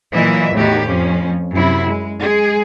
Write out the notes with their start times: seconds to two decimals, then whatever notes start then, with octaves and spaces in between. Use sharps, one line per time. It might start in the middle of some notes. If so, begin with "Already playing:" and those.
0.15 A#2 E3 F#3 D#5 E5
0.54 E2 A2 D#3 F#4 G4
0.86 F2 F3 C#4
1.53 F#2 C3 E4
1.87 G#3
2.20 G#3 G#4